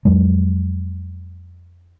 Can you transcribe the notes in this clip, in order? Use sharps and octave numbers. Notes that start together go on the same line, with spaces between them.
F2 F#3 G#3